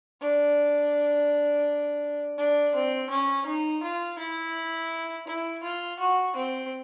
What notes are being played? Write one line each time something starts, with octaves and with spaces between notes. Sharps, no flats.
D4
D4
C4
C#4
D#4
F4
E4
E4
F4
F#4
C4